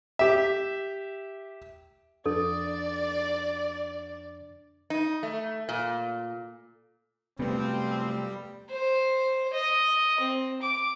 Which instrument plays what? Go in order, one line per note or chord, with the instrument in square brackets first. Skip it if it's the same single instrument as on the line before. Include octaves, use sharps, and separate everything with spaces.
[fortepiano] G4 E5
[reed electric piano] F2 D4 [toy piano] A4 [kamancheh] D5
[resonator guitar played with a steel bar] D#4
A3
A#2
[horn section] F#2 F3 C4 [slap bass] C3 A3 [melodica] G3 [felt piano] B3
[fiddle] C5
D#5
C4
D6